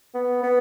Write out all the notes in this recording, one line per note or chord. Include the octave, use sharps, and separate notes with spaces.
B3
B3